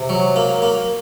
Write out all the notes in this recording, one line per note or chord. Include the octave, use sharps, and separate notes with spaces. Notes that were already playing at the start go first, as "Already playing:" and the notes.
Already playing: C3
F#3
A#3
A#3